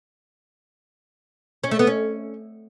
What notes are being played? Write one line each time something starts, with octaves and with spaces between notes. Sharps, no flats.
C#4
A3
B3
C#4